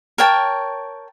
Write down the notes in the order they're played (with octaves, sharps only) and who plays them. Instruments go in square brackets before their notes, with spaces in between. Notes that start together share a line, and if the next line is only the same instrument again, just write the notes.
[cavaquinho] A#4 C#5 G5 A5